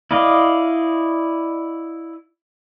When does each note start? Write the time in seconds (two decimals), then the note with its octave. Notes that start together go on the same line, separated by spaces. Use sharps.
0.11 E4 D5 D#5 F5